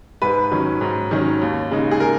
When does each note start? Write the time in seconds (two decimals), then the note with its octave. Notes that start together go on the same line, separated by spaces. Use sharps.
0.22 G#2 B4
0.51 D#3 F#3 C#4
0.81 G#2
1.11 D#3 F#3 C#4
1.41 D#2
1.71 C#3 G#3 D#4
1.91 G#4
2.00 A#4